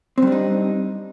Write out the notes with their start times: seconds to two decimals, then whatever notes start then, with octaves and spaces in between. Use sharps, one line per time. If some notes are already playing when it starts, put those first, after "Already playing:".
0.18 C4
0.22 G3
0.27 D4
0.32 D#4